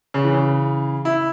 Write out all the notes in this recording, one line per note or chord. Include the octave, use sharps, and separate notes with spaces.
C#3
E3
C#3
E4